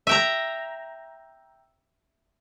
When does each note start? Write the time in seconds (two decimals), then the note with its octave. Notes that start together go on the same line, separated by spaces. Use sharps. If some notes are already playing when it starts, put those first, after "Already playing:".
0.07 E5 G5 A#5